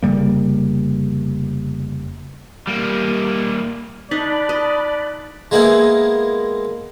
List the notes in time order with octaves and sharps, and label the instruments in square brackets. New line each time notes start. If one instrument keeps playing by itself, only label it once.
[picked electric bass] F1 C#3 G3 A#3
[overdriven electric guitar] G3 A#3
[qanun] D#4 [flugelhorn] D5 [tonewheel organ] A5 B5 F#6
[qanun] D#5
[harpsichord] G#3 A#3 B3 E4